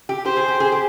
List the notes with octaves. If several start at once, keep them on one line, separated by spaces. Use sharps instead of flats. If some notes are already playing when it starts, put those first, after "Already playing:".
G4
G4 C5
G#4
G4
G#4
G4